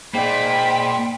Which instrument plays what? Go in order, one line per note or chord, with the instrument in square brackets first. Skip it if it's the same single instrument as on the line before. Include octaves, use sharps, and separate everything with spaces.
[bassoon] G#2 [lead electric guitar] A#3 D5 [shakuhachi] G5 [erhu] B5